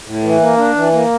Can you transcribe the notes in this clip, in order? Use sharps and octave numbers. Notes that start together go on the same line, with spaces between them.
A2
E3
A#3
D4
E3
A#3